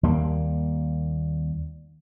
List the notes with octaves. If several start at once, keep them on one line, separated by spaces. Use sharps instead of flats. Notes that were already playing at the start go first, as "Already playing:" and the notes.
D#2 G3 A#3